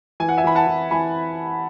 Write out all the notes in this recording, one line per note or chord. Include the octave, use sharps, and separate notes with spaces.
E3 G#5
F#5
E5 G#5
E3 B5
F#5 A5
E3
E3 G#5 B5